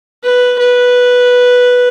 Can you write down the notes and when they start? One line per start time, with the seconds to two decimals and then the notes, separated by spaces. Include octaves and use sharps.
0.24 B4
0.59 B4